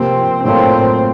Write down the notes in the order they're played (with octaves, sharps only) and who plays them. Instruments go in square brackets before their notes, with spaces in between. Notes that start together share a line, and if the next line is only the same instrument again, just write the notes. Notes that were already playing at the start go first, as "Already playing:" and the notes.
Already playing: [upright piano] C3 F3 A#3 [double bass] C4
[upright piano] A2 F#3 A#3 F4 A4 [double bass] C4